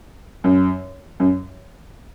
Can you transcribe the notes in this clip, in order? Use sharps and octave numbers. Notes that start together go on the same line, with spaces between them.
F#2
F#2